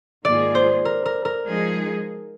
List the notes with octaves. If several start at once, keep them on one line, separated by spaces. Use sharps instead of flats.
G#2 D#3 A#3 F4 G#4 D5
C5
A#4
A#4
A#4
F3 G#3 D#4 G#4